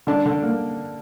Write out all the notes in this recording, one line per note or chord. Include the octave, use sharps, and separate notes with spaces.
D3 D4
D3
A#3